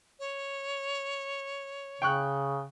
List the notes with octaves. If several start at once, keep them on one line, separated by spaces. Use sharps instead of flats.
C#5
C#3 G5 C#6 F#6